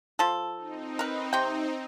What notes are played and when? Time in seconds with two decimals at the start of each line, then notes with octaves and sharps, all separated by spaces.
0.19 F3 A4
0.57 C4 D#4
0.99 A#4 B4
1.33 C3 G5